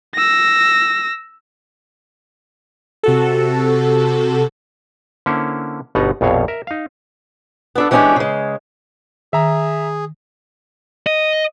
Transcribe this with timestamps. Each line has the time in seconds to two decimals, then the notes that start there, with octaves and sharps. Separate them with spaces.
0.15 E6 A#6
3.03 C3 F#4 A4
5.26 D3 A#3 C#4 E4 C5 C#5
5.95 G1 B2 B3 D#4 F#5 A#5
6.21 A#1 F2 B2 C#5 F5
6.48 A#4 E5
6.67 D#4 F5
7.75 B3 D4 A4
7.91 E3 G#3 B3 C#4 D4 G4
8.16 C#3 G#3
9.33 D#3 G#4 E5 A#5
11.06 D#5